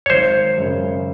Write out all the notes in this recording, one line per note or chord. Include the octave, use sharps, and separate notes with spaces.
C#5
G#1 C5
F#2 C#3